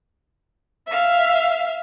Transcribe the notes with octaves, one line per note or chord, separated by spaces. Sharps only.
E5 F5